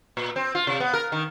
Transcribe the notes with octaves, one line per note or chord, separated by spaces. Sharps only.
A#2
C4
F4
C3
B3
A#4
D#3